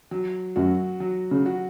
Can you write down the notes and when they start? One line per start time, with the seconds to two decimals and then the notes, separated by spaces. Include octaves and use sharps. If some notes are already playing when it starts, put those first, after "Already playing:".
0.11 F#3
0.56 F#2 F#4
1.00 F#3
1.31 C#3
1.46 F#4